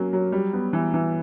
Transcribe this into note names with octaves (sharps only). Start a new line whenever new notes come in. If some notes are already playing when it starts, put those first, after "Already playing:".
Already playing: F#3 A#3 C#4
F#3
G3
B3
E3
E3